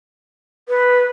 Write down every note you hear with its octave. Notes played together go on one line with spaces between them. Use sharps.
B4